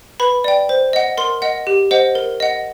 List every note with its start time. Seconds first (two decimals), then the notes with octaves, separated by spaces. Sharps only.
0.20 B4 B5
0.44 D5 G5
0.69 C5
0.93 D#5 F#5
1.18 A#4 C6
1.42 D#5 F#5
1.67 G4
1.91 C5 D#5 F#5
2.15 A#4
2.40 D#5 F#5